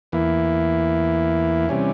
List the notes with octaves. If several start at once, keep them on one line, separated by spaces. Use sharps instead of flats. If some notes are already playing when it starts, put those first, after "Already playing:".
E2 E3 A#3 E4
C3 E3 G3 C#4